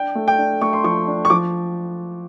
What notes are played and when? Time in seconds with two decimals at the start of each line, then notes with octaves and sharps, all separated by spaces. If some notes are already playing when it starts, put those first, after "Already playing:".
Already playing: D4 G5
0.15 A3
0.28 G5
0.38 D4
0.61 A3 C#6
0.73 C6
0.84 F3 C#6
1.07 D4
1.25 C#6
1.30 F3 D6